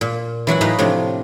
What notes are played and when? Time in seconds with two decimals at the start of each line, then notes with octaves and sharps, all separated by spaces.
0.01 A#2
0.47 E3 F#3 F#4 F#5
0.61 A2 A3 D#4 B4 D#5 F5
0.79 A2 C3 F3 D4